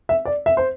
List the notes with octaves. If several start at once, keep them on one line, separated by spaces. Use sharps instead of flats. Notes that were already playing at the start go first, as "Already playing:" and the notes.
E5
D5
E5
C5